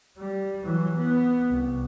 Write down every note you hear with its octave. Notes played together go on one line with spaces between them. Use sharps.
G3
E3 F#3
B3
C2